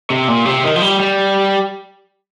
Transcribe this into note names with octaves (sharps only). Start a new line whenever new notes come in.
C3
A#2
C3
D#3
F3
G3
G3